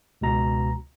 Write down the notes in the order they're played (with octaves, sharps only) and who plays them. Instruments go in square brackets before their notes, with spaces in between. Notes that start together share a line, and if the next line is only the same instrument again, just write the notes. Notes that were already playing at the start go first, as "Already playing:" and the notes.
[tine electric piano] C#2 B2 A#5